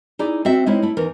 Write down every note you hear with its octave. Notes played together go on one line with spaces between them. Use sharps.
D#4 E4 G#4 D5
C4 F#4 E5
G#3 C4 C#4 D#4 E4
A3 E4
E2 D#4 A#4